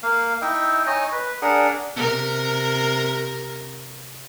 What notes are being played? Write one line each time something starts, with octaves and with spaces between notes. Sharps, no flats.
A#3 F5
D#4 E4 G5
D#4 C#5 D#5 G#5
B4
D4 G#4 A#4 F#5
C3 A#4